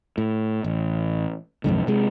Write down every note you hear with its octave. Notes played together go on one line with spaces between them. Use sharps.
A2
A1
B1 F2 G#2 D3
C3 G#3